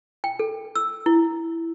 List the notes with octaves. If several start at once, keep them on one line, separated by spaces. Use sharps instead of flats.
G5
A4
E6
E4